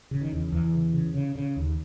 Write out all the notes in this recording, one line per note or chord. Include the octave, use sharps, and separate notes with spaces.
C#3
D#3
E2
E2 E3
C#3
C#3
C#3
C#3
D#2